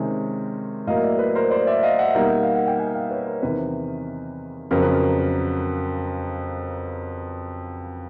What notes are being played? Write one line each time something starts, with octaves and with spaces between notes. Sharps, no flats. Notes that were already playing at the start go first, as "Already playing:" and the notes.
Already playing: C3 D#3 G#3 C#4
A2 F#3 A#3 D#5 F5
D5 E5
B4
A#4 C5
C5 D5
D5 E5
D#5 F5
E5 F#5
B2 G3 A#3 D#4
F5
F#5
G5
F#5 G#5
F5 G5
B4 C#5
A#4 C5
E2 C3 D#3 B4
F2 C#3 F#3 B3 A#4
B4
A#4